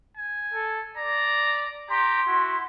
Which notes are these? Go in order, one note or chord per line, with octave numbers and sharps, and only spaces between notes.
G#5
A4
D5 A#5
G4 A#5 C6
E4 F#4